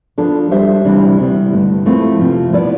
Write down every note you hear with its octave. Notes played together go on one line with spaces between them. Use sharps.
F3 B3 D4 A4
G3 D4 G4 C5 E5
D2 C3 E3 G3 D4
C3 G3 B3 E4
G2 D3 A3
F3 A3 C4 E4 B4
F2 C3 F3
F3 B3 E4 B4 D5